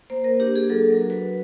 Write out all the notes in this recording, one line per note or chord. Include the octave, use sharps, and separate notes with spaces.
A#3 C5
A#4
D4 G4
G#4
F#3 A4
A#4
F#4
B4